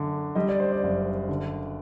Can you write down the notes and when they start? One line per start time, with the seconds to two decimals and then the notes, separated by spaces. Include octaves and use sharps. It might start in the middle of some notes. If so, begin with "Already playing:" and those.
Already playing: F#2 D3
0.35 G3 D#5
0.49 D5
0.60 C5
0.72 D5
0.83 F#1
1.29 D3